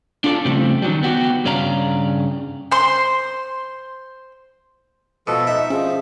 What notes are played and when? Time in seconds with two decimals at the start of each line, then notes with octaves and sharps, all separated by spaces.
0.24 D4 F4 A4 C5 D5
0.45 C#3 F3 G3 A3 C4
0.82 D#3 F#3 G3
1.03 B3 F#4 G4
1.45 G2 C#3 C#5 D5 F5 A#5
2.71 C5 C6
5.27 B2 F3 A4
5.47 D#4 D#5 E5
5.70 F3 C#4 G#4